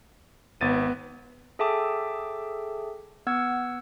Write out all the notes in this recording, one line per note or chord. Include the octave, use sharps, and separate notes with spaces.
G#1 B3 A6 D#7
G#4 A4 E5 G5 A5 D6
B3 F#5 E6 G#6